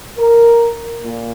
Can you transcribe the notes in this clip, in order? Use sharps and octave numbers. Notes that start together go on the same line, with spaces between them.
A#4
A#2